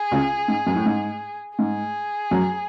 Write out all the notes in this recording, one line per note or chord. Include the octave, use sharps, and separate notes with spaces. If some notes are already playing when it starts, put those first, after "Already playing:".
Already playing: G#4
C#2 C#3
G#2
F#2
A2
G#2
G#2 G#4
F#2 F#3